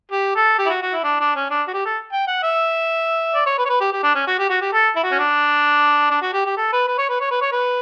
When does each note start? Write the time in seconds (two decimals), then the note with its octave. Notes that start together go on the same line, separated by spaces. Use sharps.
0.12 G4
0.36 A4
0.58 G4
0.66 E4
0.70 F#4
0.82 F#4
0.93 E4
1.04 D4
1.20 D4
1.36 C#4
1.50 D4
1.68 F#4
1.74 G4
1.85 A4
2.12 G5
2.27 F#5
2.43 E5
3.34 D5
3.46 C#5
3.58 B4
3.65 C#5
3.69 B4
3.81 G4
3.93 G4
4.03 D4
4.15 C#4
4.27 F#4
4.39 G4
4.50 F#4
4.61 G4
4.73 A4
4.96 E4
5.03 F#4
5.12 C#4
5.19 D4
6.11 D4
6.22 F#4
6.34 G4
6.45 G4
6.57 A4
6.73 B4
6.88 B4
6.98 C#5
7.09 B4
7.21 C#5
7.31 B4
7.42 C#5
7.52 B4